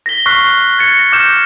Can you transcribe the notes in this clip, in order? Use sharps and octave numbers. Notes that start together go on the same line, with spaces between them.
A#6 B6 G7
C#6 F6 F#6 B6 C7
G#6 A6 C#7
A#6
D6 F6 G6 E7